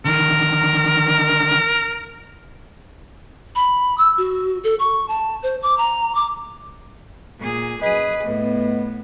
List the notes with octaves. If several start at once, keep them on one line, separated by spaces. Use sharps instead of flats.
D3 D#3 A#4
B5
E6
F#4
A4
C#6
A5
C5
D6
A#5
D6
A#2 G#4
F#2 G#4 B4 D#5
A2 B3